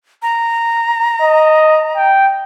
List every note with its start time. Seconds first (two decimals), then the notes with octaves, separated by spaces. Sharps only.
0.22 A#5
1.21 D#5
1.96 G5